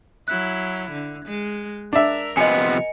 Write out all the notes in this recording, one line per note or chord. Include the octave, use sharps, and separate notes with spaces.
F#3 E4 F#6
D3
G#3
D4 A#4 E5
C3 F3 B3 D#5 G#5 C#7